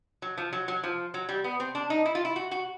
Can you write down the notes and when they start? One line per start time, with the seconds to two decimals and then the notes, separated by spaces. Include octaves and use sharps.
0.22 F#3
0.38 F3
0.53 F#3
0.68 F#3
0.84 F3
1.14 F#3
1.29 G3
1.44 B3
1.60 C4
1.75 D4
1.90 D#4
2.06 E4
2.15 F4
2.25 E4
2.36 F#4
2.51 F#4